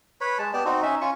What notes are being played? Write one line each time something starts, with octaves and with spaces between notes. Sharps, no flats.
B4 C#5 B5
G#3 A5
B3 G4 D5 A5
C4 D#4 F#4
C#4 D#4 E5
C#4 F4 C#6